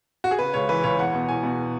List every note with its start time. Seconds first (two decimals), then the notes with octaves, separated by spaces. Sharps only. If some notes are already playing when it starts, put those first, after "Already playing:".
0.24 F#4
0.31 G#4
0.39 C#3 B4
0.54 C#2 C#5
0.69 E3 B4
0.83 C#2 C#5
0.98 E2 F#5
1.13 B2
1.28 E2 G#5
1.43 B2